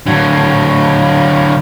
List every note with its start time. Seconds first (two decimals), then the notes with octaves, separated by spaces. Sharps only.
0.07 D3 F#3